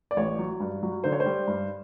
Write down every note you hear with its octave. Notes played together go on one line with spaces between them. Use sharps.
D5
A1 C#5
F#3
G2
F#3
D3 C5
C#5
C5
G3
G2